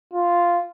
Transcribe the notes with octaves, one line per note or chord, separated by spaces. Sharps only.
F4